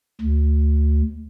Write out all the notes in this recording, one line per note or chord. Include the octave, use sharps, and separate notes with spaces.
D2